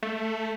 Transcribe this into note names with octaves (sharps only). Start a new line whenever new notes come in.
A3